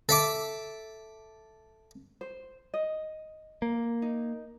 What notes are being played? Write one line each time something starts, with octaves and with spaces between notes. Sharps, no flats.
A4 E5 D6
C5
D#5
A#3
D#4